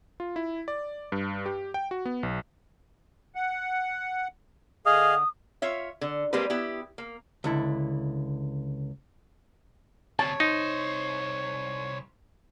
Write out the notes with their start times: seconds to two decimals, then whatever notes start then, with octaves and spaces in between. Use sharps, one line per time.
0.20 F4
0.36 E4
0.68 D5
1.12 G2
1.46 G4
1.74 G5
1.91 F#4
2.05 B3
2.23 B1
3.35 F#5
4.86 D3 G#4 D#5 F5 D#6
5.62 F4 C#5 E5
6.01 D3
6.33 G3 G#3 A#3 C4 G4 B4
6.50 B3 E4 G4
6.98 A#3
7.44 C#2 D3 E4
10.19 D2 C3 C#5 A5
10.40 C2 D#4 C5